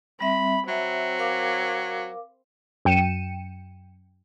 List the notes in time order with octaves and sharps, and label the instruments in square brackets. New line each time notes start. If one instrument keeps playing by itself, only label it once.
[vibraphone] G3 C4 E5 [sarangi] B5
[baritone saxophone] F#3 [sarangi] C4 [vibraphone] E5
[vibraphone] A#4 F5 D6
[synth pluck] F#2 G5 C#7 D#7 E7